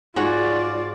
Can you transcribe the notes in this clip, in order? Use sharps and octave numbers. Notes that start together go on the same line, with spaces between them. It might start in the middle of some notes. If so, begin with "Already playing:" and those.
G#2 F4 F#4 C#5 D5